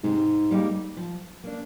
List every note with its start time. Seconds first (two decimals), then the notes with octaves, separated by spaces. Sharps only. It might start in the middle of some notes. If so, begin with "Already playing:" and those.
0.04 G#2 C3
0.51 G3 A#3 D#4 G4
0.97 F3
1.44 A#3 D4